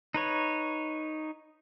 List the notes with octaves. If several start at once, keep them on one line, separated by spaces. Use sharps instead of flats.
D#4 B4 C#5